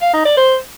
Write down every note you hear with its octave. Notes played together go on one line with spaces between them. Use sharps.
F5
D#4
D5
C5